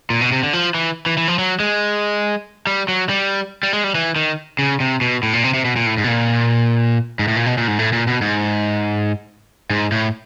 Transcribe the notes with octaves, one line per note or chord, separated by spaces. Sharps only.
A#2
B2
C3
D3
F3
E3
E3
E3
F3
F#3
G#3
G3
F#3
G3
G3
G#3
G3
E3
D#3
C#3
C3
B2
A2
A#2
C3
C3
B2
A#2
A2
G#2
B2
A#2
G#2
A2
A#2
B2
A#2
G#2
A2
A#2
B2
G#2
G#2
A2